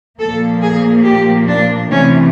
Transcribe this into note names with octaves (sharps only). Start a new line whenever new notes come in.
A#2 F3 A#3 A4
G#4
G4
D4
C3 E3 A3 C#4